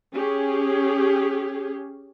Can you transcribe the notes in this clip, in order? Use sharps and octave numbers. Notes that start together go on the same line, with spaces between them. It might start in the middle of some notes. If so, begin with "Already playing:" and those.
C#4 G4 G#4